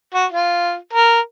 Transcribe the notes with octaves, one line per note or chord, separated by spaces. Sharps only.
F#4
F4
A#4